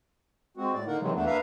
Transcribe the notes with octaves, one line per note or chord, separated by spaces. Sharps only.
G#3 C4 F#4
A2 D5
D3 A#3 D#4 A#4 F#5
C3 D#3 E3 F#3 G#3
E2 E3 A3 B3 D4
A#3 D4 B4 E5 F5 A#5